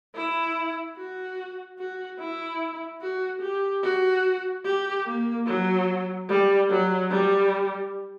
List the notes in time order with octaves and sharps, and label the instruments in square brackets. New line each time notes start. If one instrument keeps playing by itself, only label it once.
[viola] E4
F#4
F#4
E4
F#4
G4
F#4
G4
A#3
F#3
G3
F#3
G3